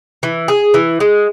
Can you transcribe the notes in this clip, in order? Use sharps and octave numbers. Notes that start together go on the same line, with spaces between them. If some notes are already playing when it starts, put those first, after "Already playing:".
E3
G#4
E3
G#3